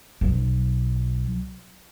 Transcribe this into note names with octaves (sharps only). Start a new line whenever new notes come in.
B1 F#3